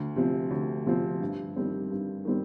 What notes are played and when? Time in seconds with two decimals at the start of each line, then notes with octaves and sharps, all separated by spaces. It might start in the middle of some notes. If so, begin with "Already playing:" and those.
Already playing: D2
0.16 C3 F3 C4
0.51 D2
0.86 C3 F3 C4
1.21 G2
1.56 D#3 G3 C4
1.91 G2
2.25 D#3 G3 C4